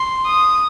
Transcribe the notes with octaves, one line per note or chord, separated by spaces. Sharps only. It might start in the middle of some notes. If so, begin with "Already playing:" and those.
Already playing: C6
D#6